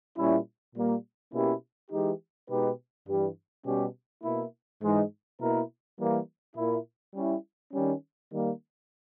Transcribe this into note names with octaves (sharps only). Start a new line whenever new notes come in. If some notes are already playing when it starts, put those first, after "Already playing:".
A#2 G3 C#4 E4
A#2 G3 A#3
B2 A#3 C#4 E4 G4
E3 G#3 D#4 G4
B2 G#3 D#4 G4 B4
G2 E3 G3
B2 G3 C#4 G4
B2 A#3 E4
G#2 E3 G#3 D#4
B2 A#3 E4 A#4
E3 G3 A#3
A#2 A#3 E4
G3 C#4 E4
D#3 G3 C#4
D#3 G3 A#3